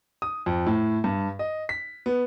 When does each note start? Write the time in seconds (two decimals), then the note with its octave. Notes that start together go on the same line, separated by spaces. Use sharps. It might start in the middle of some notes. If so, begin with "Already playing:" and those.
0.22 D#6
0.46 F2
0.66 A2
1.04 G2
1.39 D#5
1.69 B6
2.06 B3